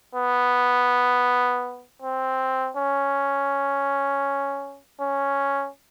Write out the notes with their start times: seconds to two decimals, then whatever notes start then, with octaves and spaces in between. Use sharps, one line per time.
0.15 B3
2.02 C4
2.77 C#4
5.01 C#4